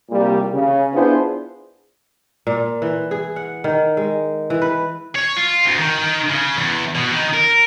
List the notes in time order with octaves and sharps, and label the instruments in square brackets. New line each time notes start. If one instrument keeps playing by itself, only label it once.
[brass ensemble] C2 A#2 G3
C#3
B3 D4 E4 F4 G#4 C5
[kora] A#2
E3
G#4
F#5
D#3
G#3
E3
B4
[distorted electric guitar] C#5
F4
D2
D#3
D#3
C#3
E2
B2
D#3
A#4